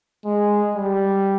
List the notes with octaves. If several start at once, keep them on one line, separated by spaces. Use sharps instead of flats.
G#3
G3